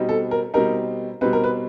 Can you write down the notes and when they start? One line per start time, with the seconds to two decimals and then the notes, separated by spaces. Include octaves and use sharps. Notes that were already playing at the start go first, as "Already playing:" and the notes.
Already playing: B2 G3 C4 D#4
0.09 A4
0.31 A#4
0.54 B2 G3 C4 D#4 A#4
1.21 B2 G3 C4 D#4 B4
1.33 A#4
1.44 B4